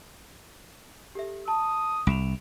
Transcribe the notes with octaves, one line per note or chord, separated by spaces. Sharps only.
G4 A4 E5
A5 D#6
C2 D7 E7 F7